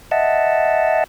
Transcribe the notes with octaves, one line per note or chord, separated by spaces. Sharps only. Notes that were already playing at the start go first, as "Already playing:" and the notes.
D#5 E5 F#5 A5